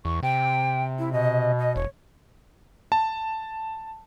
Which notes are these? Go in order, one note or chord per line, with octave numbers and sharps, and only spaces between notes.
E2 C#6
C3 G5
E4
B2 D#5
D#5
E1 C#5
A5